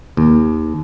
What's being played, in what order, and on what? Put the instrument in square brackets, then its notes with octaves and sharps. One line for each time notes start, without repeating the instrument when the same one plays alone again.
[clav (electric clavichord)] D#2